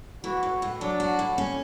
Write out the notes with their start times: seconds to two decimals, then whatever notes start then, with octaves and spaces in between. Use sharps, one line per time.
0.24 E3 F#4
0.43 A2
0.62 A2
0.81 F#3 D4
1.00 F#4
1.19 A2
1.38 C#4